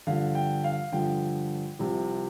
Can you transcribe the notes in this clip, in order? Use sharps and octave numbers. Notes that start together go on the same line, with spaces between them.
G2 D3 F3 F5
G5
F5
G2 D3 F3 G5
C2 C3 F3